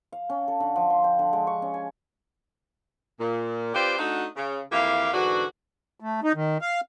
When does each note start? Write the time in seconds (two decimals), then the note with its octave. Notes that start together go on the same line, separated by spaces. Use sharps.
0.12 F5
0.30 C#4
0.48 A4
0.60 D3
0.76 F3
0.90 C6
1.04 G5
1.19 D3
1.33 G#3
1.47 C#6
1.62 C#4
1.74 G#5
3.20 A#2
3.74 C4 F4 G4 B4 C5 D5
3.99 A3 D4 D#4 F#4
4.35 C#3
4.71 F2 E3 A#3 E4 G4 F5
5.13 G#2 D3 E3 D4 F#4
6.00 A3
6.24 D#4
6.35 D#3
6.61 F5